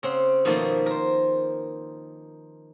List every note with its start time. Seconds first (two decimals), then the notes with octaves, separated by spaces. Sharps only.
0.03 C#3 C4 F#5
0.45 B2 D#3 F3 A3 A#3
0.86 A#4 C5